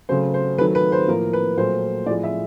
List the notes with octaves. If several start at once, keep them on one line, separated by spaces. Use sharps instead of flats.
C#3 F#3 A3 C5
C5
D#3 F#3 A3 B4
B4
C5
A2 F3 A#3 A#4
B4
A#2 F#3 A3 C5
A2 F3 G#3 D5
E5